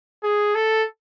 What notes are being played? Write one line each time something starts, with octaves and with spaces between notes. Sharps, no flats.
G#4
A4